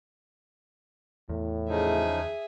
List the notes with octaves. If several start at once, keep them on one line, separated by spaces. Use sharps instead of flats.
E2 A2
C#3 F3 D#4 G#4 E5